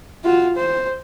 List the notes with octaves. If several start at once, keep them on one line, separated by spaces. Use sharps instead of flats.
F4 F#4
C5